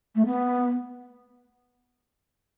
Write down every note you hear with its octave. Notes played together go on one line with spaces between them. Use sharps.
A3
B3